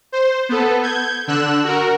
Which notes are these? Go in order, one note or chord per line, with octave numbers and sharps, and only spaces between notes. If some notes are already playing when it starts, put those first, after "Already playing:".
C5
B3 A4
G6 G#6
D3 E6 F#6
F#4 A#4